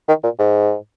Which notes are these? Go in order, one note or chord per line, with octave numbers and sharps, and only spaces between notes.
D#3
A#2
G#2